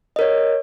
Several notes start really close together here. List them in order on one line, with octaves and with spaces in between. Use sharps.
D#5 A#4 C#5